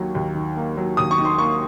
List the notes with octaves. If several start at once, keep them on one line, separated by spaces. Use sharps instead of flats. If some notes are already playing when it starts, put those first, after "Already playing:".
Already playing: D#2 D#3 F#3 A#3
D#2
D#3
A#3
F#3
D#2 D#6
C#6
D#3
C6
A#3 C#6